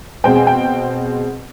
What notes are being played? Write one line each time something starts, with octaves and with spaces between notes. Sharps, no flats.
B2 G#3 C4 G5
G#5
G5